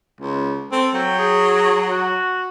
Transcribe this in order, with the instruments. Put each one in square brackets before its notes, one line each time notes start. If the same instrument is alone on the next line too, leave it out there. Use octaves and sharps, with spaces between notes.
[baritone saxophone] C#2
[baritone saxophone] C4 [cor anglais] A4
[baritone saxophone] F#3 [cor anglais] G5
[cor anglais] G#4
F#4